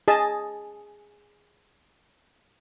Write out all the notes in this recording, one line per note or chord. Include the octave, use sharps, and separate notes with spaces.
G#4 D#5 A5